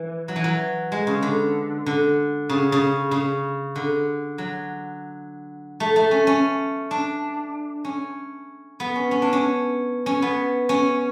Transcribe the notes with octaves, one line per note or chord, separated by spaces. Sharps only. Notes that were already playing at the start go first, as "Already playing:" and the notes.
Already playing: E3
F#3
E3
F#3
G#3
C#3
D3
D3
C#3
C#3
C#3
D3
F#3
A3
A3
C#4
C#4
D4
C#4
B3
C#4
C#4
D4
C#4
C#4
B3
C#4